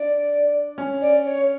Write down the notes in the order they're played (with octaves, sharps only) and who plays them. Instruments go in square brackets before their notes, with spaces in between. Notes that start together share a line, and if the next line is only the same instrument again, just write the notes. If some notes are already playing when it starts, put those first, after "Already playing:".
Already playing: [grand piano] D4 [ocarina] D5
[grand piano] C#4
[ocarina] D5
C#5